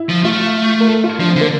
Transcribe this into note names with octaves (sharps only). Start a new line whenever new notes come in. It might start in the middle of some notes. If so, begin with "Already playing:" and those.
Already playing: E4
F3
A3 F4
A#4
A4
F4
F3 D4
C4
D3
A#3